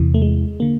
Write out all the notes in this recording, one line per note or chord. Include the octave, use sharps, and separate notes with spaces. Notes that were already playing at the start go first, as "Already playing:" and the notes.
Already playing: E2 C3 E3
A3
G#3
D3 A#3